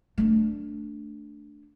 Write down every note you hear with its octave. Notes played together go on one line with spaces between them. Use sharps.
A3 D4